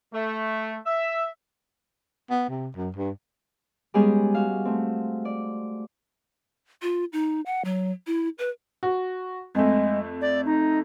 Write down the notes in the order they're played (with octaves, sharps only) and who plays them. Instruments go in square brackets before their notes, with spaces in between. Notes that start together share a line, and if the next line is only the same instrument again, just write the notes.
[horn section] A3
E5
[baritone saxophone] B3
C3
F#2
G2
[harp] G3 G#3 B3 C#4 G4 G#4
F#4 F5
A3 C4
D5
[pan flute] F4
D#4
F#5
F#3
E4
B4
[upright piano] F#4
[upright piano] F2 A3 [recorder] G#3
[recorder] D5
D#4